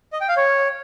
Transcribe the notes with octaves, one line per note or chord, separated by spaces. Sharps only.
D#5
G5
F5
C#5